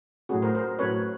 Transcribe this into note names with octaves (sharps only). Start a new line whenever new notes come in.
A2 F#3 A3 C#4 F#4 G#4
A#4 C5
A#4 C5
A2 F#3 A3 C#4 B4 C#5